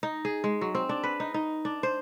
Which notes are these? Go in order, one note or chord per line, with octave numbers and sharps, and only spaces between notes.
D#4
G#4
G#3
F#3
C4
D4
B4
D#4
D#4
D4
C5